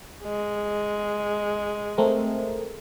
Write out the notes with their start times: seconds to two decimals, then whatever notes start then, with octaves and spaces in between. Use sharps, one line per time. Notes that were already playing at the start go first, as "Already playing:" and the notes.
0.23 G#3
1.98 A3 C4 A#4